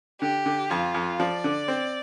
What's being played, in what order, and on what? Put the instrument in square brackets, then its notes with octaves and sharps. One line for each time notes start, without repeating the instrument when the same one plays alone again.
[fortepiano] D3 [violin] G4
[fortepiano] D3
[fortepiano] F2 [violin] F4
[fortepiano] F2
[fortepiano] F3 [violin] D5
[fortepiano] D3
C4